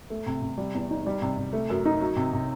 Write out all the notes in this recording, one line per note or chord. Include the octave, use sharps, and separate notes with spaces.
A3
C3
C3
G3
E2
D#4
G3
C3
C3
A3
F#2
D#4
F#3
C3
C3